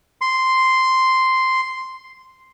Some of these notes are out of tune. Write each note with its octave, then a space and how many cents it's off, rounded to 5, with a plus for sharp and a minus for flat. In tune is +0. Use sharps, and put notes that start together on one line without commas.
C6 -5